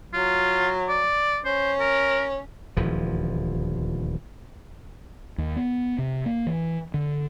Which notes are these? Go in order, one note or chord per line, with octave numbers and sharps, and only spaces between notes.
F#3 F4
D5
C#4 C5
A#4
D#1 D2 E3 F3
D#2
B3
C3
A#3
E3
D3